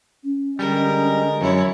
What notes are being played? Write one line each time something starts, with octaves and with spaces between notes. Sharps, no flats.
C#4
D3 G3 G#3 A#4 D#5
F#2 E4 C#5